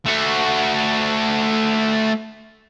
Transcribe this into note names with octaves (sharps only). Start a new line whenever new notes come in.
A3 F#4